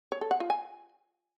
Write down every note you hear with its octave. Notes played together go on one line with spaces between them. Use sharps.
C#5
A4
F#5
F4
G#5